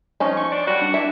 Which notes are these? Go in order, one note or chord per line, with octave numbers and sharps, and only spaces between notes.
F3 C#4 D#4
C#6
D4 D5
G3 F#4
D4
E4 E5